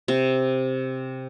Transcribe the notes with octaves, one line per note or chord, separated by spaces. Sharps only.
C3